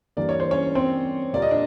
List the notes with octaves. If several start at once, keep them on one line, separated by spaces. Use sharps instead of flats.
G2 E3 G3 A#3 D5
C#5
C5
C#4 C#5
C4 C5
A#2 G3 A#3 D5
D#5
D4